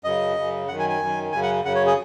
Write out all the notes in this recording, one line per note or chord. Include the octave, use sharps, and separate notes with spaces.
F#2 C#3 D#5
F#2 C#3
F#2 D#3 F#5
G#5
G#5
F#2 D#3
F#2 C#3 G#5
F#5
F#2 C#3 F#5
C#5
G#4